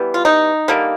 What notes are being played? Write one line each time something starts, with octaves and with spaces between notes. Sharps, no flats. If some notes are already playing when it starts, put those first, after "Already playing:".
Already playing: E3 G3 B3
F4
D#4
D3 G3 A#3